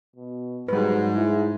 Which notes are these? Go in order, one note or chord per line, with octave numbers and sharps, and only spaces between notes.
B2
G#2 F#3 G3 B4
E4